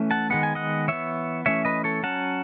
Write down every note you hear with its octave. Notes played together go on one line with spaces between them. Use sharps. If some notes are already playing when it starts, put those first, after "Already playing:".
Already playing: E3 A3 C#4
F#5 A5
D#3 G#3 B3 F#5
G#5
D#5 F#5
E3 B3 C#5 E5
E3 A3 C#4 C#5 E5
B4 D#5
A4 C#5
F#3 C#4 F#5 A5